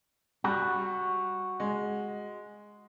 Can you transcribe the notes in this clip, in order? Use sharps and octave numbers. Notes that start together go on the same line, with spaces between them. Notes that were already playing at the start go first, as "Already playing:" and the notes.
G3 F#4
G#3